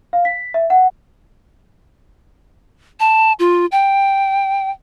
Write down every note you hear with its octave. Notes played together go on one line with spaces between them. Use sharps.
F5
B6
E5
F#5
A5
F4
G5